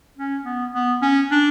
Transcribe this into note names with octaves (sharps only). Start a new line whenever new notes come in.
C#4
B3
B3
C#4
D4